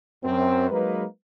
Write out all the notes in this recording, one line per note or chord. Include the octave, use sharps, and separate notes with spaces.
F#2 C4
F#3 G#3 A#3 D#4 A#4 B4